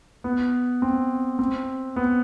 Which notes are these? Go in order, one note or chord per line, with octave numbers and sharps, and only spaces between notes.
B3
C4
C4
B3